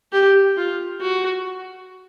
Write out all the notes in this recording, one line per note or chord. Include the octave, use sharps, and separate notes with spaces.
G4
F4
F#4